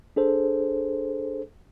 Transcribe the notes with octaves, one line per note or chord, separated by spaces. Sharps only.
D4 G#4 A4 C5